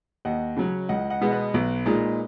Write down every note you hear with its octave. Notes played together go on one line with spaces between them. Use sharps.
D#2 D#5 F#5
C#3 F#3 C#4
C#2 D#5 F#5
D#5 F#5
B2 G#3 B3
B4 D#5
B1
A#2 G#3 D#4